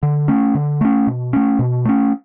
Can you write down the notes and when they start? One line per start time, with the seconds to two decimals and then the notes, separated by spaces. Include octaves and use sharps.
0.03 D3
0.28 A3 C#4
0.55 D3
0.81 A3 C#4
1.07 B2
1.33 A3 C#4
1.59 B2
1.85 A3 C#4